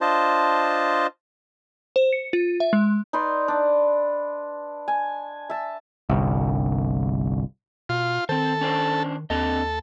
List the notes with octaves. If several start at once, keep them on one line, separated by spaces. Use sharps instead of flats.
D4 F4 C5 D#5 A5
C5
C#7
F4
E5
G#3
D#4 B4 D5 C6
D4
G#5
E5 A5
G1 C2
B2 F4
D#3 C4 A4 C5
C#4 D4 C5
D#2 D3 C4 A4 D#5